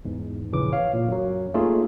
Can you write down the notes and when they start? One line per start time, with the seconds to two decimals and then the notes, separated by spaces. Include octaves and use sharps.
0.05 E2 G#2
0.52 A#1 G2 C#3 E3 C#4 D6
0.72 C#5 F5
0.93 A#2
1.08 F#2 F#3
1.54 A3 A#3 C#4 D#4 F4 G#4